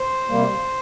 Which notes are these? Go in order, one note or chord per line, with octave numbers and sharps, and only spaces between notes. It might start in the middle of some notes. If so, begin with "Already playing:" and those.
Already playing: C5
C3 G3 A#3